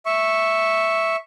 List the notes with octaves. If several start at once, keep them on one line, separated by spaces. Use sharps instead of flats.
E5 C#6